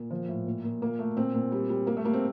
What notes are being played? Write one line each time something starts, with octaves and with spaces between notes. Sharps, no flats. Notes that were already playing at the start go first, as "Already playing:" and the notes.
Already playing: A#2
F3
A2
A#2
A#2
A#2 A#3
A3
A#2 C4
A#2
G3
G3
G3 A#3
A3
G3 A#3
C4